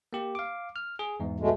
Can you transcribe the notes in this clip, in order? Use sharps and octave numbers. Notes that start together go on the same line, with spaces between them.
A#3 G4
F5 D6
F6
G#4
E2 G#2
B2 G#3 A3